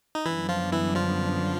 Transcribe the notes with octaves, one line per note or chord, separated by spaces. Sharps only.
D#4
F#2 D3 E3 G3 B3 D4 E4
F3 F4
E3 E4
F3 F4